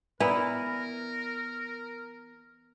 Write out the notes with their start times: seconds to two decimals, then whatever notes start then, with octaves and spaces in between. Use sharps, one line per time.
0.20 E3 B3 A#4 D5 A#5 B5